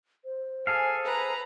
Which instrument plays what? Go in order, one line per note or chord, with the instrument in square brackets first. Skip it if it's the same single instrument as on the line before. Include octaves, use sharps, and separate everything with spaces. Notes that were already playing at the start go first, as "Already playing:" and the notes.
[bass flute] C5
[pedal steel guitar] G#4 A4 F5 [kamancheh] G#5
[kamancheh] B4 A#5